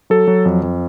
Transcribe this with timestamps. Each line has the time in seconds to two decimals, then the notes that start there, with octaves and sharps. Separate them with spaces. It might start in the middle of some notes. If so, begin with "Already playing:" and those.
0.10 F#3 A4
0.27 F#3
0.45 F2
0.63 F2